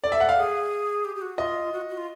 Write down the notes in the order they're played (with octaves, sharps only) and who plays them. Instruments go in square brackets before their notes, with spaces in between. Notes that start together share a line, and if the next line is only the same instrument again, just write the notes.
[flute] A4 [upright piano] D5
[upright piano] E5
F#5
F5
[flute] G#4
G4
G4
F#4
[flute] F4 [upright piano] D#5
[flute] F#4
F#4
F4